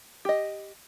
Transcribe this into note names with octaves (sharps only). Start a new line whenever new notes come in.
G4 D#5